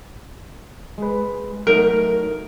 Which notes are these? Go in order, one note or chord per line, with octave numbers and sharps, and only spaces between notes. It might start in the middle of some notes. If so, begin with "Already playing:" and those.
G#3 B4
F#3 A3 D#4 A#4